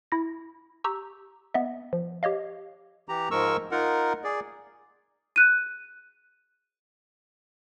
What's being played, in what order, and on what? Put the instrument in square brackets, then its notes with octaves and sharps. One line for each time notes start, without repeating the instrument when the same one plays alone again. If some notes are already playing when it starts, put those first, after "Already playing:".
[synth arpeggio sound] E4 A#6
G4 A#5 C#6 E6 G6
B3 D#5 E5
F3
G4 C#5 D#5 F5
[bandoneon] E3 G4 A#5
G#2 F3 G#3 A#4 C#6 E6
D#4 F4 A#4 F#5
G#4 D5
[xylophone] F#6 D#7